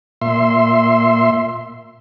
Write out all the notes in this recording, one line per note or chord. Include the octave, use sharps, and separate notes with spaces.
A#2 E5 C6